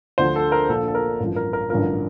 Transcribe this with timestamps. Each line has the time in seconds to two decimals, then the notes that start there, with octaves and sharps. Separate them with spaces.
0.18 D2 D3 F3 C5
0.36 A4
0.52 A#4
0.69 A#1 A#2 F3 A4
0.88 A4
0.95 A#4
1.20 A1 G2 F3
1.36 A#4
1.53 A#4
1.70 A1 G2 D3 F3 A#4